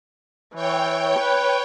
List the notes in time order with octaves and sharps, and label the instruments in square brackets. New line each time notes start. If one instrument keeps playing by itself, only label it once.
[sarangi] E3 [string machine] C#5 G5
[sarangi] B4